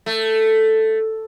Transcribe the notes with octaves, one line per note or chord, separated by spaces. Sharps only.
A3